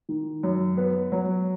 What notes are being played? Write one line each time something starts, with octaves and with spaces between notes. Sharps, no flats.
D#3
F#2
B3
F#3